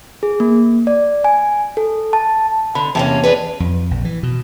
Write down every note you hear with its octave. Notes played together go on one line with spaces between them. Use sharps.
G#4
A#3
D5
G#5
A4
A5
D3 B5
E2 C3 A#3 C#4 A5
D4 G#4 B4
F2
A#1
E3
B2